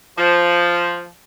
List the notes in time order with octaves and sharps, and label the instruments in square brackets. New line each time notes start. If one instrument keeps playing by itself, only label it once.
[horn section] F3